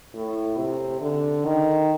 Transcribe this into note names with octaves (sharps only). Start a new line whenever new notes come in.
A2
C3
D3
D#3